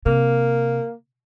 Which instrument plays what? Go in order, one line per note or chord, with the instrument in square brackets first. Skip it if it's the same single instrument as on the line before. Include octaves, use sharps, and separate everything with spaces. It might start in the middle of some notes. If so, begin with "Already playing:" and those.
[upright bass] C3 [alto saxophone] A#3